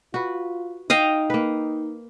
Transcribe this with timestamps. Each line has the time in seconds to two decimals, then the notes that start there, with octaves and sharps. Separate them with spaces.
0.14 F4 F#4 B4
0.90 D#4 D#5 F5 G5
1.30 A#3 B4